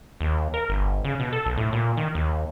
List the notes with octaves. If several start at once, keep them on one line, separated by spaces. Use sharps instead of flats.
D#2
A#4
G1
C#3
B2
A4
B1
A2
A#2
D#3
D#2